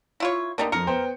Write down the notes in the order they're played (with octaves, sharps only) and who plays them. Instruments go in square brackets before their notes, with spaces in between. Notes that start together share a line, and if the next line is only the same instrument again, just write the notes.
[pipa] E4 F4 C#5
[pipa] D3 G3 D#4 [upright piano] A#3 D4
[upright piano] F2 C#7 [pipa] A#4
[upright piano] B3 C5 G5